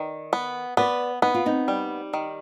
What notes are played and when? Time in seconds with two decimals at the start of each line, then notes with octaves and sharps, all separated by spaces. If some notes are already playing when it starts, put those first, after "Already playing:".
Already playing: D#3 B4 D5
0.33 B3
0.77 B3 B4 D5
1.22 B3 D#4
1.34 F4
1.46 C4 D#4
1.68 G3
2.14 D#3